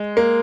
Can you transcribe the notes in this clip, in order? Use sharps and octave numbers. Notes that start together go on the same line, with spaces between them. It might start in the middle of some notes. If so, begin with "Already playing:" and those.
Already playing: G#3
A#3